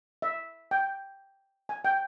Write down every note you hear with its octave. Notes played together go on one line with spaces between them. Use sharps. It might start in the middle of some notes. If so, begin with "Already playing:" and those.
E5
G5
G#5
G5